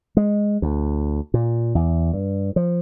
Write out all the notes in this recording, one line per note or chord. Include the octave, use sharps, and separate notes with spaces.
G#3
D2
A#2
E2
G2
F3